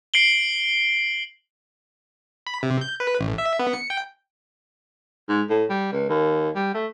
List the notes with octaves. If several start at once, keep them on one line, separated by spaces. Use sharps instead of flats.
C7 D7 F#7 G7
B5
C3
G6
B4
A1
E5
B3
C#7
G5
G#2
A2
G3
C#2
D#2
G3
A3